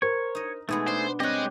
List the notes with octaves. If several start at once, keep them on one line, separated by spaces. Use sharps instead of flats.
A#4 C5 C#5
D#4 D#5
B2 G#3 A3 B3 D#4 G#4
D4 C5
G3 G#3 C4 G4 C#5 D#5 F#6